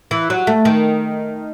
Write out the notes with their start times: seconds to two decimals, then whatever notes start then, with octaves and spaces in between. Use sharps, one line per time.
0.11 E3
0.30 F#3
0.47 A3
0.65 D#3